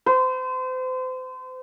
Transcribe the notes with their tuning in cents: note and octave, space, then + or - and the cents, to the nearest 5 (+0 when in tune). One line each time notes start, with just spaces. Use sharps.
C5 -35